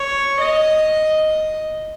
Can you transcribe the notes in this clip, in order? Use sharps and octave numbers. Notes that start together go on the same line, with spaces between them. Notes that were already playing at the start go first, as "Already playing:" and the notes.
Already playing: C#5
D#5